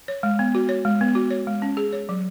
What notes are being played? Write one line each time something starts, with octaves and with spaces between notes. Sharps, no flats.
C#5
G#3
B3
F#4
C#5
G#3
B3
F#4
C#5
G#3
C#4
G#4
C#5
F#3